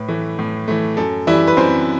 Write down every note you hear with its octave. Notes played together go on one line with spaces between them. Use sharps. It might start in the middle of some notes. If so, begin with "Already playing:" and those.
Already playing: A2 B4
E3 A3
A2
E3 A3
F#2 A4
E3 G3 E4 E5
B4
F#2 C4 C5